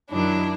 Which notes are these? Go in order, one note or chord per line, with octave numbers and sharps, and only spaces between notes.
F#2 D#3 F#3 D4 E4